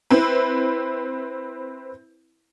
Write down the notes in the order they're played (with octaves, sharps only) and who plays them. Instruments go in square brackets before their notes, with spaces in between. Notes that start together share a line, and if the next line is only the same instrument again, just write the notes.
[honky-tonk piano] C4 E4 B4